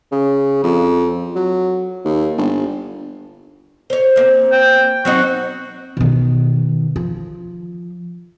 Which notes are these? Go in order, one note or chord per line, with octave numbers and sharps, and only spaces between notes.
C#3
F2
F#3
D#2
G1
C5 C#5
A#3 C4
G5
F#3 C4 D#4 F#4
B2 D#3
F3